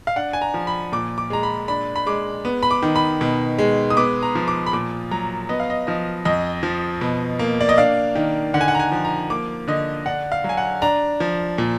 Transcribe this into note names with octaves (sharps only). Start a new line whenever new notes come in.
F5
D4 F#5
G#5
A#5
F3
B5
A#2 D6
D6
G#3 A#5
B5
D4 B5
B5
G#3 D6
B3
B5
D6
D#3
B5
B2
G#3
D#6
B3 D6
A#5
F3
D6
B5
A#2 D6
F#3 A#5
B3 D#5
F5
D#5
F3 D#5
F2 D#5
F3
B2
A#3
D5
D#5
D4 F5
D#3
D3 F#5
G#5
F#5
A#5
G#5
F3
A#5
A#3 D6
D3 D#5
D4 F#5
F5
F#3
G#5
F#5
D4 A#5
F3
A#2